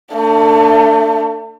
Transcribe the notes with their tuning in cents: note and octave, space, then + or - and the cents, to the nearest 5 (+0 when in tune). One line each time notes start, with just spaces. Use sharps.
A3 +35 D4 +0